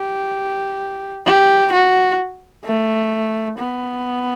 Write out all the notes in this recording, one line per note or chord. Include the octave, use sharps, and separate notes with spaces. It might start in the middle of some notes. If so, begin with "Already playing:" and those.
Already playing: G4
G4
F#4
A3
B3